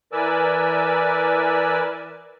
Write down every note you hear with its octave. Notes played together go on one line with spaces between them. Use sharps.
E3 A#4 B4 D5 G#5 E6